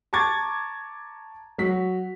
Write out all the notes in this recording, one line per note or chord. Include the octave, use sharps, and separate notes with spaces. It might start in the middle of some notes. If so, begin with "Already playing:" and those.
A5 A#5 C#6 D6 G#6 A6
F#3 F#4 B6